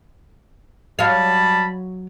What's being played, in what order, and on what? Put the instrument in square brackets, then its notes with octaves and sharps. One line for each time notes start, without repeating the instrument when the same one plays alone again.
[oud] F#3 F5 [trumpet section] G3 A5 B5